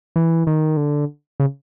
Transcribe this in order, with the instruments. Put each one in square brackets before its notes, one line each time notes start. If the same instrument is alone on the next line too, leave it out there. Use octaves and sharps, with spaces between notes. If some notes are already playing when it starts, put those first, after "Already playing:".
[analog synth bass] E3
D#3
D3
C#3